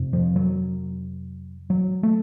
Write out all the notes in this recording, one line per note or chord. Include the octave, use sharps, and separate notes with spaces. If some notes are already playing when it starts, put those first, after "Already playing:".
Already playing: F2 C3
F3
F#3
F#3
A3